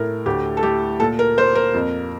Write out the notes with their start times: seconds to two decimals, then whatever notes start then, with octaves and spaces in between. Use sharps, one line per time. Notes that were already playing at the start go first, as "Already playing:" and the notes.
Already playing: A2 A3 A#4
0.26 D2 G4
0.57 A4
0.63 A3 G4
1.00 A#2 A4
1.19 A#4
1.37 A#3 C5
1.55 A#4
1.74 F2